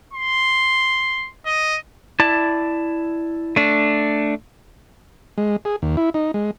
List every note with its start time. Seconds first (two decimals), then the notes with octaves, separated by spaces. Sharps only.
0.13 C6
1.46 D#5
2.20 E4 D5 A5
3.56 A3 D4
5.38 G#3
5.65 G#4
5.82 D#2
5.97 E4
6.14 D#4
6.34 G#3